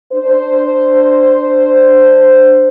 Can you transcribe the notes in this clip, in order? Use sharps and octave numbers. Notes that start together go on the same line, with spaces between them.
D4 C5